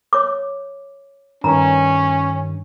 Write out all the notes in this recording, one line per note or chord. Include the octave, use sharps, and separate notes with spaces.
C#5 D6
G2 D#3 C#4 A#5